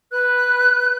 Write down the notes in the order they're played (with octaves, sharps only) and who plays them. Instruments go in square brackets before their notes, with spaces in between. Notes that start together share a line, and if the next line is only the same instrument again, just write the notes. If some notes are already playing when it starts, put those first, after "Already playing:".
[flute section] B4 F#6